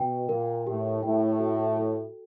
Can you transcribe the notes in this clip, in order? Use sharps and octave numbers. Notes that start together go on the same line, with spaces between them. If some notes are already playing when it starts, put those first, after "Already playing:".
Already playing: B2 G5
A#2 A#4
A2 G4
A2 G5
F#4
A4